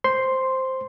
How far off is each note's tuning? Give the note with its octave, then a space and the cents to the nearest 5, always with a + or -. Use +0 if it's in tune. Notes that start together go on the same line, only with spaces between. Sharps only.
C5 +0 C6 +0